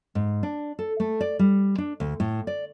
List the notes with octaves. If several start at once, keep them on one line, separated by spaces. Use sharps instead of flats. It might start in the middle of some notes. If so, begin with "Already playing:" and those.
G#2
D4
A4
A3
D5
G3
D4
D2
A2
D5